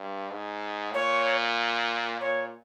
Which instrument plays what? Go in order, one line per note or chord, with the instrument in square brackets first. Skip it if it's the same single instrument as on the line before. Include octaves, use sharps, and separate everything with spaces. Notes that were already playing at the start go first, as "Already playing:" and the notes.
Already playing: [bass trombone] G2
G#2
[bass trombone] A#2 [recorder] C#5
[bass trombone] A#2 [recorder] C#5